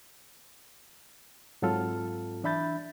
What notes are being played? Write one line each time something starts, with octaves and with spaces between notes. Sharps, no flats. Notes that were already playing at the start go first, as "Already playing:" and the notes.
G#2 F#3 C4 F4 A4 F6
E3 D4 E5 B5 G6 A6